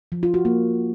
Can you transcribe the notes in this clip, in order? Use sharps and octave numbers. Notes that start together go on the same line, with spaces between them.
F3
F4
F#4
A#3